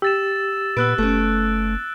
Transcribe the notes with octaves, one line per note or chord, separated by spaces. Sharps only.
G4 E6 A6 E7
A#2 B3 B4 E6 F#6 D7
F#1 A3 C#4